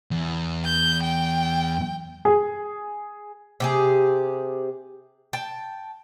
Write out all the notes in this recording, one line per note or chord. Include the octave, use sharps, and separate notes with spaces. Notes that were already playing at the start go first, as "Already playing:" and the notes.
E2
G6
G5
G#4
C3 G4 G#4
G5 A5